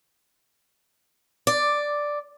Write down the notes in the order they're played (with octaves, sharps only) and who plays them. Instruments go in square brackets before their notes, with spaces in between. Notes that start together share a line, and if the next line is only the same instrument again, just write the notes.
[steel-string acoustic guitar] D5